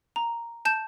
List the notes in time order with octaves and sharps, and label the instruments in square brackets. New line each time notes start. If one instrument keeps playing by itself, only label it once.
[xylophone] A#5
A5 G6 E7